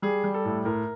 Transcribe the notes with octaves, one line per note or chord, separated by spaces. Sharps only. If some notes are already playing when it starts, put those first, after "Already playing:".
G3 G#4
G3
A4
A2
A2 A#4